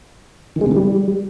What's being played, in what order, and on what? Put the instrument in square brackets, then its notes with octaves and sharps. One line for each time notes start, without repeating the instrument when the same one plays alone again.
[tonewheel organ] D#3
G#3
C3
D#3
G3